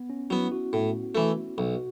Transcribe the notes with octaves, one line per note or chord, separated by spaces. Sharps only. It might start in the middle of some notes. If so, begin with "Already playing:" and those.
Already playing: B3
C#4
F#3 B3 E4
F#4
A2
E3 A3
B1 F#4